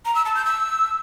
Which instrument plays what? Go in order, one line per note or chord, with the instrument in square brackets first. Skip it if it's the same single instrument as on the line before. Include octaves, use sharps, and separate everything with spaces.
[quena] A#5
E6
A5
G6
E6